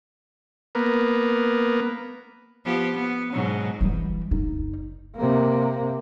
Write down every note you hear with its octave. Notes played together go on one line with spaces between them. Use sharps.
A#3 B3
F3 B3 G4
B3
G#2 B2 F#3
E3 G3
F#1 D#4
C3 A#3